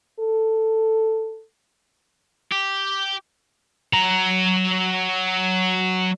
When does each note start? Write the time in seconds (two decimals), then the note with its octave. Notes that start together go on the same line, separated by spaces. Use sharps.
0.19 A4
2.52 G4
3.93 F#3 A#5